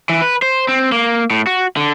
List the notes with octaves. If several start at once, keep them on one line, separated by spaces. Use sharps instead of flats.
E3
B4
C5
C4
A#3
A2
F#4
D3